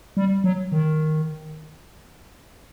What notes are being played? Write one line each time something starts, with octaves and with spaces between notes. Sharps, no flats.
G3
F#3
D#3